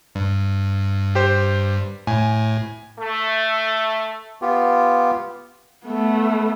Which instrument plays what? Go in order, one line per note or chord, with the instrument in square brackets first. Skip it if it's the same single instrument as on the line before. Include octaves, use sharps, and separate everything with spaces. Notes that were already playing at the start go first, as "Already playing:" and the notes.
[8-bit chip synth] G2
[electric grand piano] G4 C5
[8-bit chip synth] A2 [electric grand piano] G#5
[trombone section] A3
[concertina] B3 F4 G4
[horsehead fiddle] A3 B3